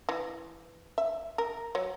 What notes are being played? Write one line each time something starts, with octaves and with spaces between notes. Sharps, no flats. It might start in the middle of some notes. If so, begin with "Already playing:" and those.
E3
E5
A#4
F#3 C#5